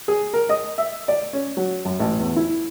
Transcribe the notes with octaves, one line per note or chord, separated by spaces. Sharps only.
G#4
A#4
D#5
E5
D5
C#4
F#3
F#2
A1
E2
E4